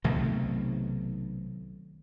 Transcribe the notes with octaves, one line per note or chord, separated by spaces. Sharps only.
B1 C3 D#3 A3